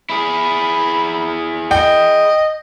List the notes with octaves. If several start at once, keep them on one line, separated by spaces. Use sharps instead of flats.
E4 G#4 B5
D#5 G5